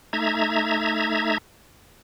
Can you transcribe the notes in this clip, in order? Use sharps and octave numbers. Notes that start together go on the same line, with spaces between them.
A3 D#4 E5 A#5 G#6